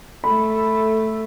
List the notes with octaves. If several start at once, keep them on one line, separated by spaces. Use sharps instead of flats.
A3 A4 B5